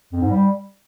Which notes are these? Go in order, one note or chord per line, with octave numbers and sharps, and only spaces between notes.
F2
G#2
G3